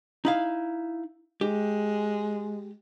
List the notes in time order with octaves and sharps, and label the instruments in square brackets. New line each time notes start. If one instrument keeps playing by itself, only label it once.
[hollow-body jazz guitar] D#4 E4 F5
[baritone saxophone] G#3 [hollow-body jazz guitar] G4